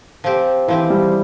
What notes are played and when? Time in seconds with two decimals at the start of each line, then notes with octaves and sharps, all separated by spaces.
0.24 F3 C4 G4
0.68 E3 F3 C4 G4
0.90 G3